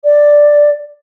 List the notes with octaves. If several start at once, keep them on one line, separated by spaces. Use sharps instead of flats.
D5